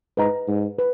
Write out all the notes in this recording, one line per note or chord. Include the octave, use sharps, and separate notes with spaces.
G#2 B4 D#5 A#5
G#2
B4